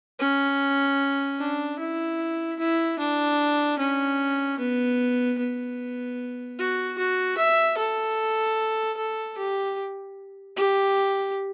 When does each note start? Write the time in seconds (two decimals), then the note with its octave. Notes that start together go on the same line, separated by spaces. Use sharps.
0.19 C#4
1.39 D4
1.79 E4
2.59 E4
2.99 D4
3.79 C#4
4.59 B3
5.38 B3
6.59 F#4
6.98 F#4
7.38 E5
7.77 A4
8.97 A4
9.37 G4
10.56 G4